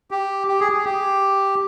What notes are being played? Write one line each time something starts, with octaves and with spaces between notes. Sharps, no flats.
G4
G4
G#4
G#4
G4